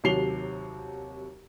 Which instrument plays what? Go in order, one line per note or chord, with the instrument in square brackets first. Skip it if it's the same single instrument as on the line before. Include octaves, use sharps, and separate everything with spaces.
[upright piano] D#2 C3 F#3 C7 F7 G7